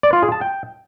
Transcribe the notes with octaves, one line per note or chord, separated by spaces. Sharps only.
D5
F4
G#4
A5
G5